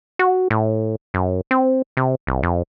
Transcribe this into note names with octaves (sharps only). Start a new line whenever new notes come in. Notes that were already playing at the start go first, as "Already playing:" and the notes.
F#4
A2
F#2
C4
C3
C2
F2